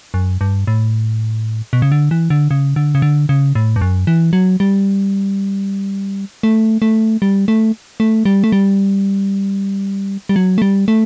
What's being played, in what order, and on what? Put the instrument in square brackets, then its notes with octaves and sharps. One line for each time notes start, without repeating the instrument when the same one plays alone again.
[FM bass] F#2
G2
A2
B2
C#3
D3
E3
D3
C#3
D3
C#3
D3
C#3
A2
G2
F#2
E3
F#3
G3
A3
A3
G3
A3
A3
G3
A3
G3
G3
F#3
A3
G3
A3